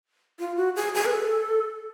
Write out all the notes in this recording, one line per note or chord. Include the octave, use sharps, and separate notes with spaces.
F4
F#4
G#4
G#4
B4
A4